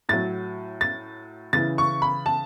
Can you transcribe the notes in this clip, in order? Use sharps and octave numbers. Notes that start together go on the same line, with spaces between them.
A2 F#3 A6
A6
C#3 E3 A6
C#6
B5
A5